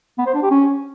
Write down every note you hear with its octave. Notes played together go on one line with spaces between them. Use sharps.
B3
C5
D4
G4
C#4